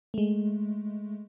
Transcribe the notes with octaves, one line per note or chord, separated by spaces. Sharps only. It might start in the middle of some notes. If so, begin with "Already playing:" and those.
G#3 A3